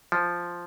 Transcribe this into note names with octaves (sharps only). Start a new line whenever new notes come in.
F3